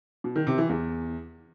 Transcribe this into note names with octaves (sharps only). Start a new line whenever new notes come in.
B2
D#3
C3
E3
E2